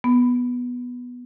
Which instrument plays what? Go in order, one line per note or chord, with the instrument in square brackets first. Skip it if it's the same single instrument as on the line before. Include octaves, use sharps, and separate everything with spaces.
[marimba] B3